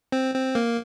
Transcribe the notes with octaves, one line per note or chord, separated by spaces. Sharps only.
C4
C4
A#3